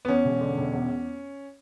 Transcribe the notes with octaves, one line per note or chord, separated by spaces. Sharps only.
B3
E2 C#4
E1
D3
E1
E2